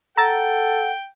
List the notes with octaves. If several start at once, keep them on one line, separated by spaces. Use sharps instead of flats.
A4 F#5 G5 A#5 E6 A6